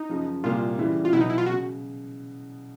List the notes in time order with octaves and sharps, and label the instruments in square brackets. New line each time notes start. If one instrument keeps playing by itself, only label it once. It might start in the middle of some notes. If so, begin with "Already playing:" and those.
Already playing: [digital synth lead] D#4
[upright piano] F#2 C#3 F3
[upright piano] C2 A#2 G3 A#3 [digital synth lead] F4
[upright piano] C#3 E3 G3 B3 E4
[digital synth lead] F4
[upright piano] B2 F#3 B3 [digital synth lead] E4
[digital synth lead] D#4
E4
F4
[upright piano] C#3 [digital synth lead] F#4